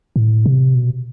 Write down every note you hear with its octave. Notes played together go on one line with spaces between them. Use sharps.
A2
C3
B2